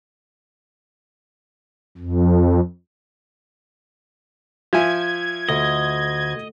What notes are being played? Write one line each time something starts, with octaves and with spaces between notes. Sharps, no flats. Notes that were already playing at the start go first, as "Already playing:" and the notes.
F2
F3 E5 G#5 G#6
D2 D#5